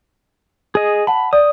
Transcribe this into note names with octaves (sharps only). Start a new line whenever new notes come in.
G#4 D#5
F#5 A5 B5
D5 D#6